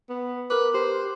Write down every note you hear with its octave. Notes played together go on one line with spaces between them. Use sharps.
B3
A#4 B4 D6
G4 C5